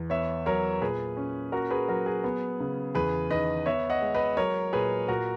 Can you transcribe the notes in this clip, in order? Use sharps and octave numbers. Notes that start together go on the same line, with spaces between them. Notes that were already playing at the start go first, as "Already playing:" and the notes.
Already playing: E2
B3 C#5 E5
F#3 A#4 C#5
A#2 G#4 B4
C#4
A#3 F#4 A#4
G#4 B4
F#3 F#4 A#4
G#4
B3
C#3
E2 G#4 B4
D#3 B4 D#5
B3 C#5 E5
D#5 F#5
G#3
B4 D#5
F#3 A#4 C#5
A#2 G#4 B4
A#2 F#4 A#4